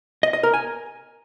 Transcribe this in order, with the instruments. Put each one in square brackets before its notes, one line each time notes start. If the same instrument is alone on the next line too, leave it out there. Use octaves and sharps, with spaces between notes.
[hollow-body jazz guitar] D#5
D#5
A#4
G#5